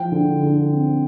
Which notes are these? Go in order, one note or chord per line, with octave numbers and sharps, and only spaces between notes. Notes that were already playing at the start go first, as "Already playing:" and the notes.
Already playing: F3 G5
D3
D3
C4